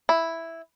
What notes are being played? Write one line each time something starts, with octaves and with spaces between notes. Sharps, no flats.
E4